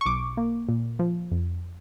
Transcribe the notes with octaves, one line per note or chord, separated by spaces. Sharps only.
C#6
B1 D6
A#3
A#2
F3
F2